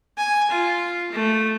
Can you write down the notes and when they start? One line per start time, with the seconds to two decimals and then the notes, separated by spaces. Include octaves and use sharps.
0.18 G#5
0.50 F4
1.12 A3